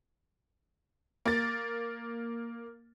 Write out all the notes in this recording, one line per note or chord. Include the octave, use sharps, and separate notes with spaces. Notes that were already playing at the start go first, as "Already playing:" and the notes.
A#3 A6